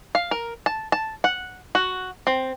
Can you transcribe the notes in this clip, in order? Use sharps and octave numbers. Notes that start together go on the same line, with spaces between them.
F5
A#4
A5
A5
F#5
F#4
C4